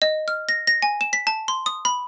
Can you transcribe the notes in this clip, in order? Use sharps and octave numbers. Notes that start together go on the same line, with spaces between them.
D#5
F6
A#6
A#6
G#5
E7
B6
A5
C6
D#6
B5